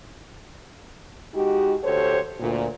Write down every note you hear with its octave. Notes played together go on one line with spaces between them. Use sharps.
G#3 D#4 F#4 G4
D2 G4 A4 C5 C#5
D2 A#2